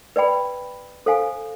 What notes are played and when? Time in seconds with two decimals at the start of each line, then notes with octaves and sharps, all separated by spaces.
0.16 B4 D5 G5 B5
1.06 A4 C5 F5 G#5